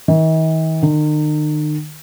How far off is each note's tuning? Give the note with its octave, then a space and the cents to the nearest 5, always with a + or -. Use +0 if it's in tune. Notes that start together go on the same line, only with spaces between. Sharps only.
D#3 +45
D#3 -40